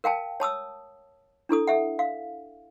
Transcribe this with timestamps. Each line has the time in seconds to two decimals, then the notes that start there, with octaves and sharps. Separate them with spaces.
0.04 A#4 F5 G5 A5
0.40 C#5 A5 D#6 E6
1.49 D4 E4 A4 D#6
1.67 A4 E5 F#5
1.99 F5